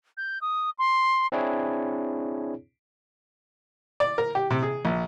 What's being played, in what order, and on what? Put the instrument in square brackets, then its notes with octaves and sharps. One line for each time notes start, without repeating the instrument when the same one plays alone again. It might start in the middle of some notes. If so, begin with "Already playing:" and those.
[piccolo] G6
D#6
C6
[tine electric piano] C4 D4 E4 G#4 C#5
[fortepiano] D5
A#4
G4
C3
G#4
A#1